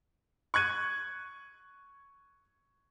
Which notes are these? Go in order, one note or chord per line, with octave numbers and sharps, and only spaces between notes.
C#6 F#6 G#6 D#7